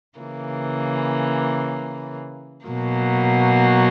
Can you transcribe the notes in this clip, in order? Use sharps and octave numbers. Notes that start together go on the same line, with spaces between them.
C#3 E3 A#3
B2 F#3 A#3